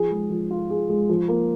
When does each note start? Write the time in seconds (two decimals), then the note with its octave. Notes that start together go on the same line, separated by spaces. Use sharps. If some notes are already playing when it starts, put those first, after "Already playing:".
Already playing: F3 G#4
0.11 G#3
0.30 F3
0.51 F4
0.70 G#4
0.89 G#3
1.09 F3
1.28 A#3